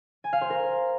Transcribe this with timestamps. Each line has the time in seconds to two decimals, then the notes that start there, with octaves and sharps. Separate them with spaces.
0.24 G#5
0.33 F5
0.41 C5
0.50 A#4